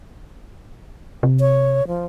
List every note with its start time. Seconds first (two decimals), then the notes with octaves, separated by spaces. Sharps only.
1.23 C3
1.40 C#5
1.88 F3